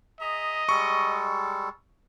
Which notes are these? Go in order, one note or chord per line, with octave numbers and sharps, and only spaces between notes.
G#4 D#5 E5 A#5
G3 G#3 A4 C#6